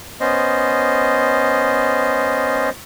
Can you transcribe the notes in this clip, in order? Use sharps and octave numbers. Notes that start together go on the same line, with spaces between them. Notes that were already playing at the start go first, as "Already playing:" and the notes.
B3 C#4 C5 D#5